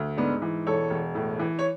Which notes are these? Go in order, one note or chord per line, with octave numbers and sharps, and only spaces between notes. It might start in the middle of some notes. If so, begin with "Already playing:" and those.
Already playing: D2
G#2 B3 D4
E3
E1 A4 C#5
E1
A2
E3
C#5